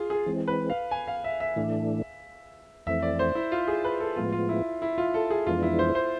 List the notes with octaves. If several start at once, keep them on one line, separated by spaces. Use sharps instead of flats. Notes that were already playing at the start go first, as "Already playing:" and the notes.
Already playing: F4 G#4
G#4
E3 G#3 C4
B4
F5
G#5
F5
E5
E5
A2 E3 A3 D4
F2 E3 A3 C4 E5
D5
C5
E4
F4
G#4
B4
A4
A2 F3 G#3 B3 F4
F4
E4
E4
F4
A4
G#4
F2 E3 G#3 B3 D4 F4
E4
C5
C5